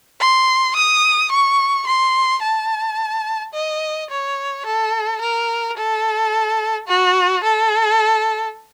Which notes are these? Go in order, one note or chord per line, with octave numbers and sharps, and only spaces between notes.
C6
D#6
C#6
C6
A5
D#5
C#5
A4
A#4
A4
F#4
A4